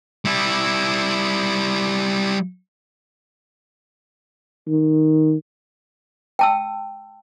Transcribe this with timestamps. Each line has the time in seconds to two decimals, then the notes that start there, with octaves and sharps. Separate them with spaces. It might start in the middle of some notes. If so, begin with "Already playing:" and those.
0.25 G3 E4
4.67 D#3
6.39 G5 A5 E6